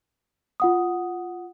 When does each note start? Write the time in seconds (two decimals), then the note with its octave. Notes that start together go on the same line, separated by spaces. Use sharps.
0.60 F4 F#5 D#6